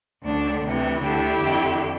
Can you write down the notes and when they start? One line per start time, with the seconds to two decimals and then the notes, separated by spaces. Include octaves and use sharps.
0.24 D2 D3 D4
0.63 D2 C3 E3
1.02 D2 D3 E4 G4
1.41 F2 D3